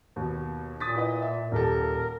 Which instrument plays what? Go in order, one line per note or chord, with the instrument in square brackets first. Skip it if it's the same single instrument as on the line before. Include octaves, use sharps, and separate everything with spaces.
[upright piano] D#2 B2
[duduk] A#2 [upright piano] D#6 A6 B6
[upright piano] E4 B4 D#5
E5
[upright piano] D#1 G4 A4 [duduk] A#4